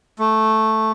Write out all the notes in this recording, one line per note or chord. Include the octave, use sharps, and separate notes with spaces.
A3